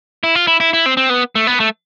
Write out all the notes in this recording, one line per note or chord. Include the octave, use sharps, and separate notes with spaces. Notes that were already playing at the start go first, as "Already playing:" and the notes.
E4
F4
E4
E4
E4
C4
C4
B3
A3
B3
A3